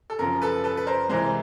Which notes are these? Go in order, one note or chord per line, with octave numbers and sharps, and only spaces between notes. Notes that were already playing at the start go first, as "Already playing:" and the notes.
A4
F#2 C#3 F3 A#4
A4 B4
A4 B4
B4
A#4 C5
C2 C3 E3 G#3 A#4 C5